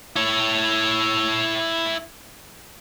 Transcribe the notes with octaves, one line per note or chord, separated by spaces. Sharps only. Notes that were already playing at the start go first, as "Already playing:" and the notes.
E4 C#5